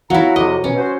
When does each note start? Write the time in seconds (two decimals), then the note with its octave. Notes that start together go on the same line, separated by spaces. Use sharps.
0.10 F#3 E4 F#4 F5 A#5
0.36 F2 C3 D#5
0.64 B2 C#4
0.77 F#4 C5